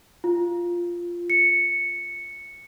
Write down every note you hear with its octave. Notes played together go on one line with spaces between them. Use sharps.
F4
C#7